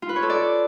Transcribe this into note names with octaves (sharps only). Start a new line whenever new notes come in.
F4
B4
C#5
A4
D5